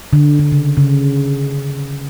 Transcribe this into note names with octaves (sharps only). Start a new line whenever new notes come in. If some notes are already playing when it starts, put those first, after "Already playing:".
D3
D3
C#3
C#3